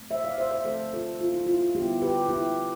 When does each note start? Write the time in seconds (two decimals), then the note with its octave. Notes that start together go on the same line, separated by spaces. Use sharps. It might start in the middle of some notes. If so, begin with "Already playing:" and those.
Already playing: B2 A3 C4
0.11 C5 E5
0.25 D5 F5
0.38 C5 E5
0.51 C5 E5
0.65 D3 F3 A3 C4 A4 C5
0.93 F4 A4
1.21 F4
1.34 E4
1.47 F4
1.61 F4
1.75 D3 G3 B3 D4 E4 G4
2.02 G4 B4
2.29 E4 G4